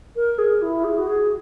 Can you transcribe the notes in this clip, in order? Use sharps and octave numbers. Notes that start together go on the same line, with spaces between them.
A#4
G#4
E4
G#4
F#4
G#4